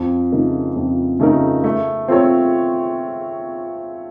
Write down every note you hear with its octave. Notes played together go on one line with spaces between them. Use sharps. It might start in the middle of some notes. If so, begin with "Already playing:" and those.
Already playing: F2
C#3 A3 D#4 A#4
F2
C#3 A3 D#4 A#4
A3
C4 F4 A4 C#5